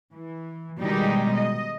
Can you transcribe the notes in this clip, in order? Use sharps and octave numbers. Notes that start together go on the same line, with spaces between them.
E3
B2 D#3 G3 G#3 D#4 G4
D#5